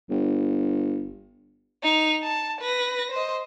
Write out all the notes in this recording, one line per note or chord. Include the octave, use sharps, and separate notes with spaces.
G1
D#4 F7
A5
B4 A#6
C5 D#5